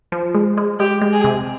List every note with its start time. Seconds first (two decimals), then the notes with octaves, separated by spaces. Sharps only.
0.12 F3
0.35 G#3
0.57 G#3
0.79 G#3 G4
1.01 G#3
1.13 G#4
1.24 C3